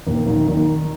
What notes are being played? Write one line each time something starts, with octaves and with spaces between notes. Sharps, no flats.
D#2
D#3
D#3